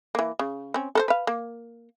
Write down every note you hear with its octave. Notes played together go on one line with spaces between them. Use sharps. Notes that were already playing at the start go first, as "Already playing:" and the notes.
E3 A#3
C#3
C4 C#4
A4 A#4 C5
B4 F5
A#3